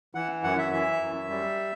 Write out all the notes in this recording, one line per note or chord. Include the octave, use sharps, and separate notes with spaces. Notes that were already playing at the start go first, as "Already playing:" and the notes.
E3 F#5
F#2 F#5
E5
E3 E5
F#2
G3